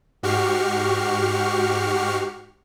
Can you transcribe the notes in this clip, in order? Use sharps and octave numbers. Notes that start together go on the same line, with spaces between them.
G#2 F#4 G4 C#6 F6 C7